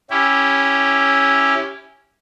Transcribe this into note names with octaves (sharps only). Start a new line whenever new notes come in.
C#4 E4 G4